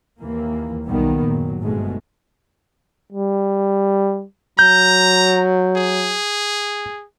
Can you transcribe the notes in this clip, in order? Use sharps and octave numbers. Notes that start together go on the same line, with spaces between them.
D#2 E3 A#3
B1 B2 D#3 G3 A#3 B3
F#1 A#2 F#3
G1 G#2 B2 G#3 A3
G3
F#3 A#5 G6
G#4